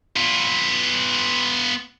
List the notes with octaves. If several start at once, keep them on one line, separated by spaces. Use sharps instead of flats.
B3 F4